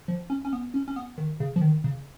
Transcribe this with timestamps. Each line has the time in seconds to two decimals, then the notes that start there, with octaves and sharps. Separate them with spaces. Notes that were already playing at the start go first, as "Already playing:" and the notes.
0.08 F3
0.30 C#4
0.45 C#4
0.53 B3
0.74 C#4
0.88 C#4
0.96 B3
1.18 D#3
1.40 C#3
1.56 F3
1.61 D#3
1.84 C#3